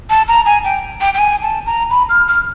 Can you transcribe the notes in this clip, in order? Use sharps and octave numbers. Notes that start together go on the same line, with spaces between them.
A5
A#5
G#5
G5
G5
G5
G#5
A5
A#5
B5
F6
F6